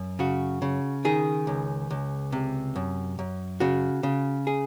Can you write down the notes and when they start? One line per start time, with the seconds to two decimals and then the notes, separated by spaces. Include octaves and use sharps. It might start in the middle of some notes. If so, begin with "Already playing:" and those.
Already playing: F#2
0.19 C#3 F#4
0.62 C#3
1.05 D#3 G#4
1.47 C#2
1.91 C#2
2.32 C3
2.76 F#2
3.19 F#2
3.60 C#3 F#4
4.03 C#3
4.47 G#4